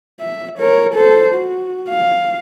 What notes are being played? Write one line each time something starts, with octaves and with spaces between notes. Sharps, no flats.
E5
A#4 C#5
A4 C5
F#4
F5